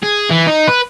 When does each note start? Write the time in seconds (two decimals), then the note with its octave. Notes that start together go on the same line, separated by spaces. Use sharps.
0.03 G#4
0.30 E3
0.47 D#4
0.68 B4